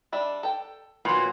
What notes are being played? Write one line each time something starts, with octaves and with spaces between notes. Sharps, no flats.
G3 D4 E5
A4 G5
A#2 F#3 B3